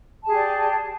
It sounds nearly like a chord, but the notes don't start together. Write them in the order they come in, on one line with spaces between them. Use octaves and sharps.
A5 G#4 G4 D5